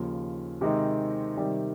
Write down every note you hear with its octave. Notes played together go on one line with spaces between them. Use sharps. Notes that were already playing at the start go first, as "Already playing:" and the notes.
Already playing: D#2 C#3 F3
C3 D#3 G#3 C4 D#4
C3 D#3 G3